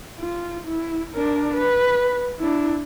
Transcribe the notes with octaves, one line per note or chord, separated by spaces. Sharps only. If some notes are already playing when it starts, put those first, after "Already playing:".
F4
E4
D4 A#4
B4
D4 E4